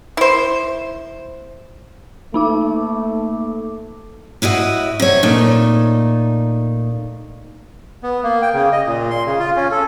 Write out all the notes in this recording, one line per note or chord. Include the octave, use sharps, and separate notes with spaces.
E4 C5
A3 A#3 D#4 D6
A2 E4 F#4 D#5
C3 C#5
A#2 A3 D#4
B3
A#3
G5
C#3
D#5
A#2
C6
C#3
F4
C#4
A4